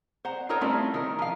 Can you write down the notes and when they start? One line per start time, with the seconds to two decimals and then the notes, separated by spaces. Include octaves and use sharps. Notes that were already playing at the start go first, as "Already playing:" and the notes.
0.25 C5 F#5 A#5
0.49 D#4 F4 A4 A#4 C#5
0.61 G3 A3 C4 C#4 E4 F4
0.94 D#3 A#4
1.19 F3 F5